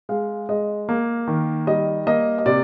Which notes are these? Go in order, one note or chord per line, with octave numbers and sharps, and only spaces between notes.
G#3 F5
G#3 D#5
A#3
D#3
G3 D#5
A#3 D#5
D#5
C3 D5